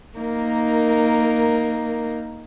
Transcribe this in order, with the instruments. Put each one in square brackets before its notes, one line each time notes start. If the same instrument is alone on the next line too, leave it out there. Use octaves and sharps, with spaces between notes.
[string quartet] A#3 D#4 A#4